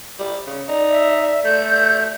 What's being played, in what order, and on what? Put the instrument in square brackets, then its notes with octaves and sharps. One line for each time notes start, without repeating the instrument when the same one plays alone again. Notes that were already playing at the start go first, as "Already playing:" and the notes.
[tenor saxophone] G3
C#3
[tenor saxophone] D#4 [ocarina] D5
[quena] E5
[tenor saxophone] A3 [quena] G6